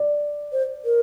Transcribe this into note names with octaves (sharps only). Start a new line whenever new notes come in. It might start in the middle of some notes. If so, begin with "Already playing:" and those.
Already playing: D5
C5
A#4